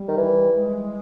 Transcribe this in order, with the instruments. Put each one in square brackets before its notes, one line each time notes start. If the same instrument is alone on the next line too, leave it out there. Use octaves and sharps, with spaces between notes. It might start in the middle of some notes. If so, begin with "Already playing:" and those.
Already playing: [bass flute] G3
[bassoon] D#3
E3
[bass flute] G#3